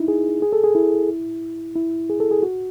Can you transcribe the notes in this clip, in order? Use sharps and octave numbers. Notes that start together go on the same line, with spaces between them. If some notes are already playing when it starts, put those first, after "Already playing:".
Already playing: D#4 E4
G#4
G#4
A4
G#4
E4
E4
G#4
A4
G#4
F#4